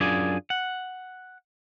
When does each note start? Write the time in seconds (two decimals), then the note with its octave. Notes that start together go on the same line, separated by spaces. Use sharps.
0.01 F#2 D4 F4 G#4 D5 G#5
0.50 F#5